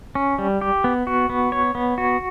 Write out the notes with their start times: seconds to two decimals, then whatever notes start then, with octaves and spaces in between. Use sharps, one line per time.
0.15 C#4
0.39 G3
0.61 G4
0.84 B3
1.07 F#4
1.30 B3
1.52 C#5
1.75 B3
1.98 F#4